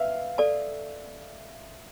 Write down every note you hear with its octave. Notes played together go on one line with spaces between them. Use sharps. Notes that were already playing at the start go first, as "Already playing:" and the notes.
Already playing: B4 E5 F5
A4 D5 A5